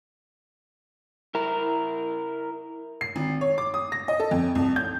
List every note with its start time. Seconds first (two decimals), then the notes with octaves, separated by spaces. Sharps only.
1.35 E4 A#4
3.01 C7
3.16 G#1
3.41 C#5
3.58 D6
3.74 D#6
3.92 A#6
4.08 D#5
4.20 A4
4.31 F2
4.55 C2
4.76 G6